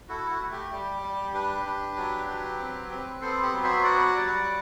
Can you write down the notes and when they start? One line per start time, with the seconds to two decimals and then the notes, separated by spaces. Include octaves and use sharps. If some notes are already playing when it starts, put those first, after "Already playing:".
0.09 E4 F#4 A4
0.30 F#4
0.40 A3
0.51 G4
0.71 G3 G4
1.02 G3
1.34 D4 G4 B4
1.66 D4
1.96 F#3
2.28 F#3
2.59 C4
2.90 C4
3.21 B3 A4 C5
3.42 G4
3.53 F#3
3.63 C5 E5
3.83 F#4 D5 F#5
4.16 G3